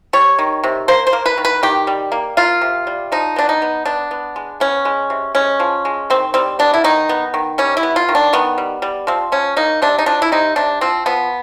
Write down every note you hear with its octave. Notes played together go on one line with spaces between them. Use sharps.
G3 C#5
D#3
C3
A#3 C5
C5
A#3
B4
D#3
B4
D#3 G4
G3
A#3
A#3 F4
C3
G3
F3 D#4
B3 D4
D#4
B3
B3 D4
B3
G#3
B3 C#4
G#3
C3
G#3 C#4
F3
G#3
D#3 C4
G3 C4
B3 D4
E4
D#3 D#4
B3
D#3
G3 C#4
E4
B3
F4
D#3
D4
D#3 B3
G3
G3
F3 C4
F3 C#4
A#3 D#4
C3 D4
D#4
F3 D4
E4
C3 D#4
C3 D4
F3 C4
F3 B3